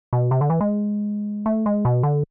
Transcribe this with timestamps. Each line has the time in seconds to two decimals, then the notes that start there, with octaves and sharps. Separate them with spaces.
0.13 B2
0.31 C3
0.41 D3
0.50 E3
0.61 G#3
1.46 A3
1.66 G#3
1.85 B2
2.03 D3